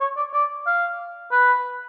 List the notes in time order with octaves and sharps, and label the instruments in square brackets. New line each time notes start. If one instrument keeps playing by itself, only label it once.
[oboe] C#5
D5
D5
F5
B4